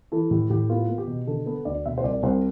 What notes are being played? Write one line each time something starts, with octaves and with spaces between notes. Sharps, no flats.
E3 A4
A2 G4
A2 G4
B3 F4
B3
G4
B2
D3 A4
B3 A4
D2 D5
B2 E5
C5
C2 D5
C2 C5